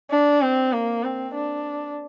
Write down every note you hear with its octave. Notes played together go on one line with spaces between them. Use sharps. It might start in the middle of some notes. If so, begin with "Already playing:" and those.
D4
C4
A#3
C4
D4